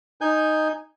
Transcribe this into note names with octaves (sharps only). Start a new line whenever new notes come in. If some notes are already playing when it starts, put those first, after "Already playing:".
D#4 G#5 G6